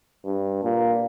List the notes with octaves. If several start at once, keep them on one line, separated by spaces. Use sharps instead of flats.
G2
A#2